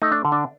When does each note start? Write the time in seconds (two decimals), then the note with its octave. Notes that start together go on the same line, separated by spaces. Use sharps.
0.02 A3 D#4
0.12 D4
0.25 D3
0.32 D4